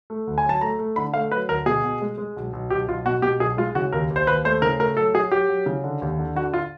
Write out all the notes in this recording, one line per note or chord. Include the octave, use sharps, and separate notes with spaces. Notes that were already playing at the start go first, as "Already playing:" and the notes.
A3
D2
G#5
F#3 A5
A3 A#5
A3
D3 B5
A3 F5
F#3 B4
D2 A#4
B2 G#4
B2
G#3
G#3
B1
B1
B1 G4
B1 F4
B2 F#4
B2 G4
B1 G#4
G#3 F4
C#3 F#4
D#2 A#4
D#2
C5
D#2 B4
A3 C5
C#3 A#4
A3 A#4
F#3 A4
F#3 G#4
F#3 G4
F#3
C#3
D3
D#2
D3
D3 F#4
F4